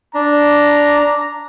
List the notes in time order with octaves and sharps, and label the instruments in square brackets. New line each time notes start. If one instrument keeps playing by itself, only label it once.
[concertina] D4 [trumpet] A#5